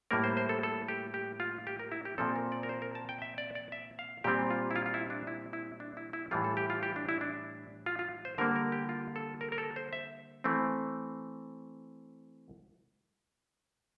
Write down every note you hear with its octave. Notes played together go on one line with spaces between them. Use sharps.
A2 G3 A#3 A#4
C5
C5
A4
A4
G4
G4
F4
G4
A#4
E4
G4
A#2 F3 C4 A4
A#4
D5
A#4
C5
A#4
A5
G5
E5
D5
D5
E5
F5
A#2 G3 C4 G4
F4
E4
F4
F4
E4
D4
E4
E4
D4
E4
E4
A2 E3 G3 F4
A4
G4
F4
G4
D4
E4
D4
F4
F4
C5
D3 G3 A#3 A#4
A#4
G4
F4
A4
A#4
A#4
A4
C5
E5
E3 A3 C4